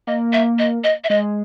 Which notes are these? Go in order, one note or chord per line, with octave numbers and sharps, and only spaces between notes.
A#3 D#5
E5
D#5
D#5
E5
G#3 D#5